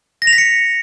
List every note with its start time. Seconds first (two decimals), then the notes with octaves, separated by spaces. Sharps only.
0.22 A#6
0.27 F7
0.33 B6
0.38 C#7